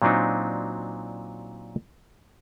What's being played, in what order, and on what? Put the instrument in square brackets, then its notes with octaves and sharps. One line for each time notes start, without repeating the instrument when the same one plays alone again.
[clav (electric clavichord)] A#2 F#3 C4 D4 D#4